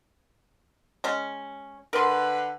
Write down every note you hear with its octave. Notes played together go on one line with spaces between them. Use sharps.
G#3 C#4
D3 A#4 B4 C6